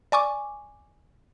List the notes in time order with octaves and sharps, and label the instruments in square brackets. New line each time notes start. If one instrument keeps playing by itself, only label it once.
[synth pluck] D5 G#5 C#6 D6